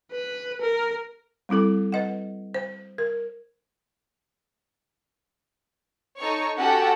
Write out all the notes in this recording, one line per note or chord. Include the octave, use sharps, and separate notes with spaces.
B4
A#4
G3 C4 E4 A4 D6
B4 D#5 F#5
C5
A#4
D#4 A4 C#5 C#6
C#4 F#4 G4 A4 F#5 G5